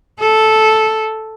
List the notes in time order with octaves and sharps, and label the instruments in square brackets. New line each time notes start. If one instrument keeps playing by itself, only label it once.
[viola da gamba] A4